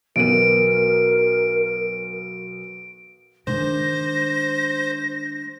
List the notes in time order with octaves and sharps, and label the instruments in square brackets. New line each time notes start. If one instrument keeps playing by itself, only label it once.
[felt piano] B1 B3 D#7 [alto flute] A#4 [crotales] D7
[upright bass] D#3 G#3 [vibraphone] D4 [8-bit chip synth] C5 [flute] A#6